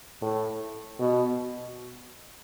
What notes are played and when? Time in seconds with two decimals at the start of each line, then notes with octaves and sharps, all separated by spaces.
0.22 A2
1.00 B2